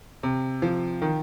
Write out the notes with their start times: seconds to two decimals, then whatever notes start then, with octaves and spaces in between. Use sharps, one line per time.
0.23 C3
0.62 F3
1.02 D#3